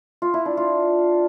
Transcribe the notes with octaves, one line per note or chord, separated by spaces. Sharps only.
F4
E4
D4
F4